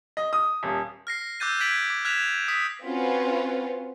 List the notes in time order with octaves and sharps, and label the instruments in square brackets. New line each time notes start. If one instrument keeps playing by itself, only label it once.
[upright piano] D#5
D#6
D#1
[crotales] F6 A#6 C7
D6 E6 F#6 G6 A6 D#7
F#6 G#6 B6 D7 F#7
D6
F6 F#6 G#6 B6 E7 F7
D#6 B6
[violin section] C4 C#4 F4 F#4 B4